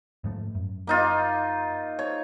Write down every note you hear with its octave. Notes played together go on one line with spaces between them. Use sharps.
G#2 F3 A3
F#2
A#3 D#4 F4
C#5